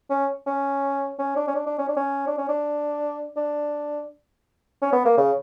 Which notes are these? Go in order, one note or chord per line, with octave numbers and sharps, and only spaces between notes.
C#4
C#4
C#4
D4
C#4
D4
D4
C#4
D4
C#4
D4
C#4
D4
D4
C#4
B3
A#3
C#3